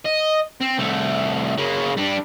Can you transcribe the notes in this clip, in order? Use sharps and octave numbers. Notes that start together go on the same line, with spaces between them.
D#5
C4
C2 A3
C#3 A#3
G3 D4